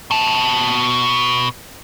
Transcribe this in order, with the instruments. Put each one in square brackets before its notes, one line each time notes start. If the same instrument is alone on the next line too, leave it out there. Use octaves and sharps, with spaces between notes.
[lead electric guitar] B2 A5